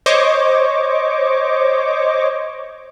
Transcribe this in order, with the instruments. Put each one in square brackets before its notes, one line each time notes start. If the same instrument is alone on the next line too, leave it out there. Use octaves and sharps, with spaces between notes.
[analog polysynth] C5 C#5 D#5 C#6 D6